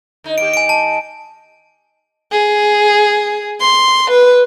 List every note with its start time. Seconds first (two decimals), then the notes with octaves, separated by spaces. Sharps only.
0.24 D3 D#4
0.38 D#3 A#3 G4 D7
0.53 G#5 D7
0.69 A5
2.32 G#4
3.61 C6
4.11 B4